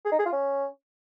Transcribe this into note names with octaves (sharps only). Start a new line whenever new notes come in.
G#4
D#4
G#4
F4
C#4